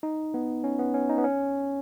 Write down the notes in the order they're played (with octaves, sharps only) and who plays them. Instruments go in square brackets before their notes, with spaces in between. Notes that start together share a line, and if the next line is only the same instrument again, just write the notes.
[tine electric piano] D#4
B3
C#4
B3
C#4
D#4
B3
C#4